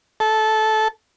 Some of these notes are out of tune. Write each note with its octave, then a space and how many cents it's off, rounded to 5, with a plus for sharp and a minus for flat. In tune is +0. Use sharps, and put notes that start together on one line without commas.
A4 -15